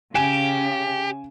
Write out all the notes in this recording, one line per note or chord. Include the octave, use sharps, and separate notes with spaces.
C#3 G4 G#5 D7 E7